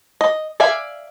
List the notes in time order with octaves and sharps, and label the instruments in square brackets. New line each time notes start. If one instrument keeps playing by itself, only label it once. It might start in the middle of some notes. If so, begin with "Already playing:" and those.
[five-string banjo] D#5
D5 E5 F5 G#5